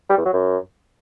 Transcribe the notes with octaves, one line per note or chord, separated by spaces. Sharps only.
G3
E2
F#3
F#2